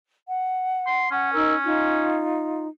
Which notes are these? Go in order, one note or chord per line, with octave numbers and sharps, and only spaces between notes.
F#5
C6
C#4 F#5
D#4 A#4 E6
D#4 F4